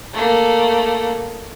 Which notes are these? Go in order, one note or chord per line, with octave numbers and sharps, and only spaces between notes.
A3 A#3